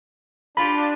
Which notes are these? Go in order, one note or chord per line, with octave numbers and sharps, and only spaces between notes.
D4 F4 G4 B5